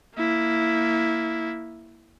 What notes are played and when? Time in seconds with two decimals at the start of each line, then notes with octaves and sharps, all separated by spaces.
0.16 A#3 E4